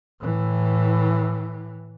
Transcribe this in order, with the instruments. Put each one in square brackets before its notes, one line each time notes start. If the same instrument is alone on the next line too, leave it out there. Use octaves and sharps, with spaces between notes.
[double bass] A2 E3